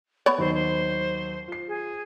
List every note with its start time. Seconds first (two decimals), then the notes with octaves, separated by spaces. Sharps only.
0.26 B3 C#5
0.38 D#2 F#3 D#4 C5
0.54 C5
1.48 F4 C7
1.68 G#4